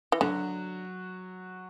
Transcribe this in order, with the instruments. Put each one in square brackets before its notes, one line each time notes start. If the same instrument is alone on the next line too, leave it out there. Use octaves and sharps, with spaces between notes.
[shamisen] E3
[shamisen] D3 [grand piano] F#3 F#4